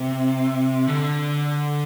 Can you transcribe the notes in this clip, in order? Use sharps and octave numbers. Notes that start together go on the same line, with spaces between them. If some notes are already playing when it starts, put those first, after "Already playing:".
Already playing: C3
D3